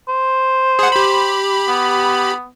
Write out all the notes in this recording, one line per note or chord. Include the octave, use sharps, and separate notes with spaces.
C5
G#4 F#5
G4 B5
B3